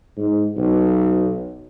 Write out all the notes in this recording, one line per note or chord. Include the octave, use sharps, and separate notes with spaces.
G#2
B1